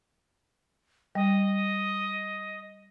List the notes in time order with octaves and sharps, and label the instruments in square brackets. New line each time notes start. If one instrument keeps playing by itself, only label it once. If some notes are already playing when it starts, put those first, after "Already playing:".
[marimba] G3 [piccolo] D#5